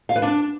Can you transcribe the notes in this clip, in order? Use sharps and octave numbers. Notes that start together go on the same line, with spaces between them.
F5
B4
D4